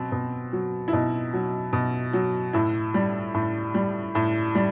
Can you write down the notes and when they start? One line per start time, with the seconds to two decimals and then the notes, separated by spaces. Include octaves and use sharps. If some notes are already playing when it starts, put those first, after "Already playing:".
Already playing: B2 F#3 C4
0.12 B2
0.53 F#3
0.88 E4
0.92 B2 D#4
1.34 F#3
1.73 B2
2.13 F#3
2.53 A2 E4
2.94 G3
3.34 A2
3.74 G3
4.15 A2
4.55 G3